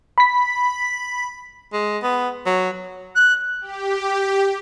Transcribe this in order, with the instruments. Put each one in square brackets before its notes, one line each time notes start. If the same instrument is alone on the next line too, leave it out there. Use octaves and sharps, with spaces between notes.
[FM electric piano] B5 B6
[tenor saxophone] G#3
B3
F#3
[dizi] F#6
[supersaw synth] G4